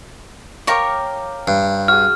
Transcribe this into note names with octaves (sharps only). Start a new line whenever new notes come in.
A#4 C#5 F5 G5 C#6 D6
G2
F#4 G#4 F6